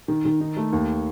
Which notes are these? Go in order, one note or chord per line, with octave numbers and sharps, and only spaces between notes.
D#3
D#3
D#4
A3
D#2